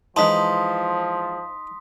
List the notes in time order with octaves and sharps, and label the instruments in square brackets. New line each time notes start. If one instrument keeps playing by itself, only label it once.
[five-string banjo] E3 G#3 A5 [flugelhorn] F3 [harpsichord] D#4 [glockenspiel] C6 D#6 B6